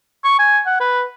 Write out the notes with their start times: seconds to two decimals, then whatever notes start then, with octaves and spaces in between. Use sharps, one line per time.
0.24 C#6
0.39 G#5
0.67 F#5
0.80 B4